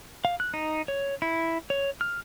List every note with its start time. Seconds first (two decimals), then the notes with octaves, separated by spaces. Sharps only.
0.25 F5
0.40 F#6
0.54 D#4
0.88 C#5
1.22 E4
1.70 C#5
2.01 F6